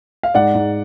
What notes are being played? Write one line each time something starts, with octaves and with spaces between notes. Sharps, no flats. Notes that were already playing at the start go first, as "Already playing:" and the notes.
F5
G#2 D5 F#5
G#2